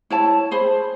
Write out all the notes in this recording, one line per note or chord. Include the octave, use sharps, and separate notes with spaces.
E4 C#5 A5
G#4 C5 B5